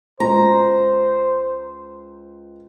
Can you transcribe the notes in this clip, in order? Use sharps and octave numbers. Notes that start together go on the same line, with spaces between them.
C#2 C5 A#5